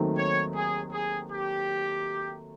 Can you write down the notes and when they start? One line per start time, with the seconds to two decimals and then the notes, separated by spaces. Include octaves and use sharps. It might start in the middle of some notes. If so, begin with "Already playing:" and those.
Already playing: D#2 D#3 F#3 A3 C4
0.17 C#5
0.55 G#4
0.92 G#4
1.30 G4